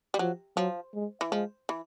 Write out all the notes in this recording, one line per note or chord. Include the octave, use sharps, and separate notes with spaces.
G3
F3 F#3
F3 F#3
G#3
E3
F3 G#3
E3